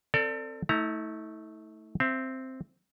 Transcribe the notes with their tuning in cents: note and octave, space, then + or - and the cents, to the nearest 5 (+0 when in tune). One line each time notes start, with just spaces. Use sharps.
C4 +0 A4 +35 D5 +0
A3 +5 E4 -45 A#5 +0
C4 +0 E5 +20